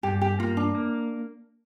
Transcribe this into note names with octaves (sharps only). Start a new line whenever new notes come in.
G2 G4
G4
A#3 F4
D4
A#3